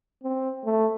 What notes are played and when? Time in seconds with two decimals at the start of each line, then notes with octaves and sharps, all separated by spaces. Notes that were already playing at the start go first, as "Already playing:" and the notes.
0.23 C4
0.65 A3